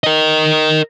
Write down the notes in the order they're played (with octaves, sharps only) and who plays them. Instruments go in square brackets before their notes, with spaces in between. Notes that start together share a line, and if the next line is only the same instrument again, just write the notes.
[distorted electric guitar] A#4 D#5